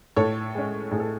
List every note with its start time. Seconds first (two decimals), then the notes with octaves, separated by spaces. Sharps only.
0.16 A2 A4 C#5
0.55 G#3 C#4
0.91 A2 G#4
1.00 A4